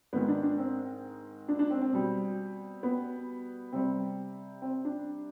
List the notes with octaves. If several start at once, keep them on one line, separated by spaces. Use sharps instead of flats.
G#2 D#3 G#3 B3
D4
D4
C4
D4
D4
C4
C4
B2 G3
B3
C3 G3 C4
C4
D4